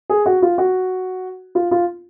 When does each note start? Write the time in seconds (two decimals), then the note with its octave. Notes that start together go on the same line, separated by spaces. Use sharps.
0.10 G#4
0.26 F#4
0.42 F4
0.58 F#4
1.55 F4
1.71 F4